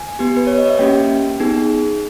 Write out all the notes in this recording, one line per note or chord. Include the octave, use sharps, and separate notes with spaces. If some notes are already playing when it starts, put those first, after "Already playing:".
Already playing: G#5
B3 G4
B4
C#5
D#5
E5
A#3 C#4 G4 G5
B3 D#4 G#4